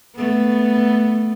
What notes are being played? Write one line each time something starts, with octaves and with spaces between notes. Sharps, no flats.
A3 B3